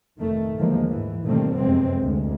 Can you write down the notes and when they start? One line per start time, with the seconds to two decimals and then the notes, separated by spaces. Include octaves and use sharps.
0.19 F1 D#3 A3
0.56 D#2 D3 E3 F3 G#3 A#3
0.88 G#2 E3
1.24 B2 D#3 G3 A3 A#3 C4
1.55 F1 F#2 C3 G#3 B3 C4
2.02 D2 G#3